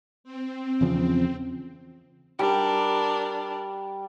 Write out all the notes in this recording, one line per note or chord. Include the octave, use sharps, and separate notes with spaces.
C4
E2 C#3 F3
G3 D4 A#4